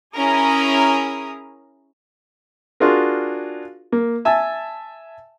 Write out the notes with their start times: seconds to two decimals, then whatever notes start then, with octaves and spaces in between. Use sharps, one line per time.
0.16 C#4 E4 G#4 A#4 A#5 D#6
2.80 D4 F4 F#4 G#4 A#4
3.92 A#3
4.25 E5 G#5 A5 E6